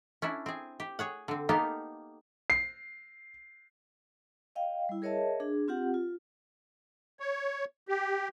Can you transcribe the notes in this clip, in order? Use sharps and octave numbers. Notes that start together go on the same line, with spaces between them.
C#4 D4 E4
C4 G#4
G4
G#4 C#5 F#5
D3 C4
A#3 B3 D#4 G4 A4 F5
C7
D#5 F5 G5
G3 E4
G#4 A#4 C#5 D#5 E5 A5
D4 G#4
C4 F4 G4 F#5
F4
C#5
G4